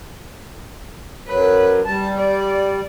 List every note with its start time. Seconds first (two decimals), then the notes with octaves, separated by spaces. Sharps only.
1.28 F#2 F#3 B4
1.86 G3 A5
2.17 D5